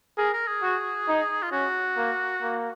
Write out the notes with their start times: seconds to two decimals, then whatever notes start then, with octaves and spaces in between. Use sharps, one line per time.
0.18 G#4 A#4
0.34 A#4
0.48 G#4
0.63 F#4
1.08 D#4
1.43 F4
1.52 C#4 F#4
1.97 A#3
2.42 A#3